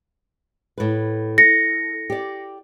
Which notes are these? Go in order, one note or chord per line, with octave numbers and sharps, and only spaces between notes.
A2 B4
A4 A#6 C#7
G4 D5